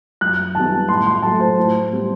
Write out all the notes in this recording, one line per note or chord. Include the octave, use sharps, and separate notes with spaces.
F#2 F#6
D#3 G3 B3 A5
A2 C6
C6
F#3 A3 A5
C5
A2
G3 B3